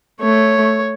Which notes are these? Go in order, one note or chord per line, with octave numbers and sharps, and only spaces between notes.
A3 C#5